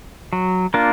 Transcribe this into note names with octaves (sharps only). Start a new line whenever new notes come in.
F#3
A#3 D4 F4 A#4